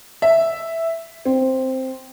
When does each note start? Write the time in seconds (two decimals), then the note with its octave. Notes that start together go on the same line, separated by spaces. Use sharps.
0.22 E5
1.25 C4